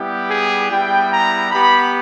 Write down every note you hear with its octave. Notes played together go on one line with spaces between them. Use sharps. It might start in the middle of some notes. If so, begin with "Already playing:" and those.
Already playing: G3 B3 E4 G4
G#4
G3 B3 E4 G5
A#5
B3 G4 B5